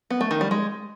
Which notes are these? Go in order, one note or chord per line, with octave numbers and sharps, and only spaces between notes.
B3
A3
D#3
G3
G#3